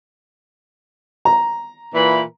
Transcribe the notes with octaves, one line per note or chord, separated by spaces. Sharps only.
A#5
A#2 E3 B5